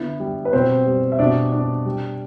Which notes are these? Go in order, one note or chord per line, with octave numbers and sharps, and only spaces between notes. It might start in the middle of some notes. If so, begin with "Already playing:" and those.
Already playing: D3 B3 E4
G3
B4
B2 C4 C5
G3
E5
B2 D4 D5
D4
G3